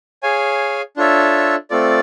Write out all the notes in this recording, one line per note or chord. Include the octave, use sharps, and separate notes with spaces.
G#4 C#5 F5 G#5
D4 F4 A4 C#5 E5
A3 C4 F4 A4 D5